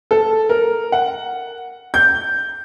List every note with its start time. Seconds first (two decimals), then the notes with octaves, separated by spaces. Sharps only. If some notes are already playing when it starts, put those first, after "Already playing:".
0.11 A4
0.49 A#4
0.92 F#5
1.94 G6